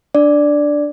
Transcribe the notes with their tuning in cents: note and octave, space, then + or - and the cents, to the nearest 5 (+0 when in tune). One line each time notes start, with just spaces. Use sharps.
D4 +0 D5 +0